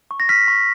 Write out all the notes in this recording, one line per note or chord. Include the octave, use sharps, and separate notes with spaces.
C#6
A#6
F6 B6
C#6